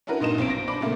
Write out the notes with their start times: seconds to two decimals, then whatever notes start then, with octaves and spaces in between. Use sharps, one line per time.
0.07 C#4 D4 E4 F#4 A#4 B4
0.20 G2 A#2 D#4 D#5 E7
0.38 B1 C4 D7
0.50 A#6
0.68 D4 C5 B5 D6
0.81 A#2 C#3 A3 A#3